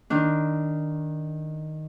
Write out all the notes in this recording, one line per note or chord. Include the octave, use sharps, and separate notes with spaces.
D#3 D4